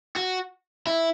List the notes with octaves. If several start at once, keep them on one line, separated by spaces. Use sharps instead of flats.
F#4
E4